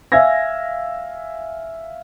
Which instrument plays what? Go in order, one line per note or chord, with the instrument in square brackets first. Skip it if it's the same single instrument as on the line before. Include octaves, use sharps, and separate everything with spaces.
[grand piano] E5 F5 G#5 E6 G#6 A#6